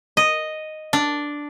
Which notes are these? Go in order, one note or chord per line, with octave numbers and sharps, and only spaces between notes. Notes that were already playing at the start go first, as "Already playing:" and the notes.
D#5
D4